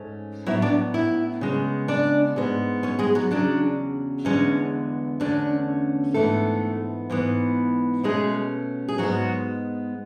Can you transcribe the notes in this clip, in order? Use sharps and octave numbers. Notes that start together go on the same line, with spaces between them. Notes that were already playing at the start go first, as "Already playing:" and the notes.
Already playing: G#2 A3 C#4
A2 F#3 B3 E4 E5
D4 D5
E4 E5
C#3 G#3 B3
D4 D5
G#2 G#3 B3
C#4 C#5
G#3 G#4
F#3 F#4
E2 C#3 F#3 D4
E2 D3 G#3 B3 C#4
E2 D3 A3 C#4 D4
G#2 E3 A3 B3 A4
G#2 E3 B3
B2 G#3 A3 C#4 G#4
G#4
G#2 F#3 G#3 B3 F#4